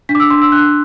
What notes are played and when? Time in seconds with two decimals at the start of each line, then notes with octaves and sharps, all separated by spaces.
0.09 D4 B6
0.15 D6
0.20 E6
0.30 D4 C6
0.41 E6
0.52 D4 F#6